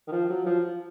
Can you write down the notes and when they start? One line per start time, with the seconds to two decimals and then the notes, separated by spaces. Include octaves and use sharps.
0.08 D#3
0.12 F3
0.29 F#3
0.46 F3